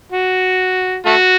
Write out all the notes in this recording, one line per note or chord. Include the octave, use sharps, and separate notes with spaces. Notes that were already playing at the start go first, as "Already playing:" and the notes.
F#4
A3 F#4